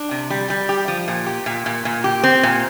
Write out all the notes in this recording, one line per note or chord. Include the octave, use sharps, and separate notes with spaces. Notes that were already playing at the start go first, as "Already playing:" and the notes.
Already playing: D4
C3
G3
G3
G4
F3
A#2
G4
A#2
A#2
A#2
G4
C4
A#2